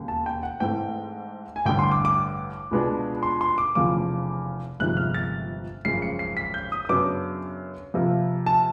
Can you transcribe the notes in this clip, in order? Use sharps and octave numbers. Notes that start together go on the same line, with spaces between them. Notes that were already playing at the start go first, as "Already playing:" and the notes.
Already playing: E1 D#2 C#3
A5
G5
F#5
G#2 E3 A3 C4 G5
G#5
A1 G2 D3 G5
C6
D6
D6
C#2 B2 G#3 B3 D4
C6
C6
D6
F1 E2 C#3 F3 A#3 D6
G1 F2 C3 D#3 G#3 F#6
F6
A6
G#1 F#2 C#3 F3 G#3 C7
C#7
C7
B6
G6
D#6
D#6
F#2 C#3 F#3 B3 D4 D6
F2 C3 F3 A#3
A5